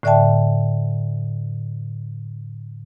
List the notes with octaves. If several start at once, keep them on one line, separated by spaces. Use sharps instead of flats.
A2 D3 D5 E5 G5 A5